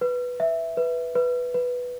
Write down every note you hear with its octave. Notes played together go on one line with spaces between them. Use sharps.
B4
E5
B4
B4
B4